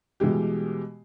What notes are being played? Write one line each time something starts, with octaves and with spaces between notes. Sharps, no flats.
B2 E3 G3 G#3 G4